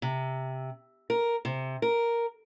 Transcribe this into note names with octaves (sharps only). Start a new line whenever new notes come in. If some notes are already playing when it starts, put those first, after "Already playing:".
C3
A#4
C3
A#4